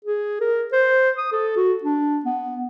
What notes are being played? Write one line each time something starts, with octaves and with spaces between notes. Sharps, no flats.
G#4
A#4
C5
D#6
A4
F#4
D4
B3